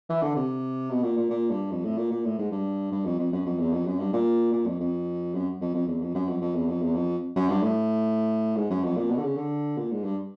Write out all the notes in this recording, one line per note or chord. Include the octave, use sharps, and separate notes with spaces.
E3
D3
C3
B2
A#2
A#2
A#2
G2
F2
A2
A#2
A#2
A2
G#2
G2
G2
F2
F2
F#2
F2
E2
F2
F#2
G2
A#2
A#2
F2
F2
F#2
F2
F2
E2
F2
F#2
F2
F2
E2
F2
E2
F2
F#2
G2
A2
G#2
F#2
F2
A#2
B2
D3
C#3
D3
A#2
G#2
G2